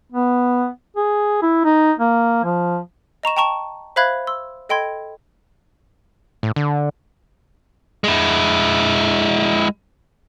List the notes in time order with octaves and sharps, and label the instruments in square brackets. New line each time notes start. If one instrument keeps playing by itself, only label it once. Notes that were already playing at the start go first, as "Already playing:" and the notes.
[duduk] B3
G#4
E4
D#4
A#3
F3
[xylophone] D#5 A#5 C#6 E7
G5 A5 A#5 C#6 E7
C5 E5 F5 B5 F#6 G#6
C6 E6
A4 D#5 G5 B5 C6 G#6
[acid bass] A2
D3
[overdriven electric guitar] G#3 E4